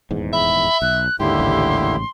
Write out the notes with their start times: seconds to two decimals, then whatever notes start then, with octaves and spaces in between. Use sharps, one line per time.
0.11 D#1 E2 G#2
0.33 E5 B5
0.82 B1 F#6
1.20 D#2 G#2 D3 E4 G4 C6
1.39 A1 G#2 C#3